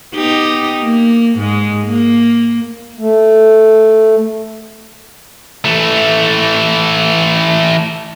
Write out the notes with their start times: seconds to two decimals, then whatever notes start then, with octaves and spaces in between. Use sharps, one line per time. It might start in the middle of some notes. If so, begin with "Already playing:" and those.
0.15 B3 D#4 G4
0.81 A#3
1.38 G#2 G#3
1.87 A#3
2.98 A3
5.65 E3 A3